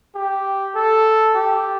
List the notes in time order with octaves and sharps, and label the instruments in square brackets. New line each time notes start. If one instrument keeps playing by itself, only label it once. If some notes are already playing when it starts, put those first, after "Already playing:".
[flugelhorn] G4
A4
G4